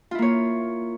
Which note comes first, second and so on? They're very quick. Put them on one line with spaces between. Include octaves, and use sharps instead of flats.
F4 E4 A#3 C#5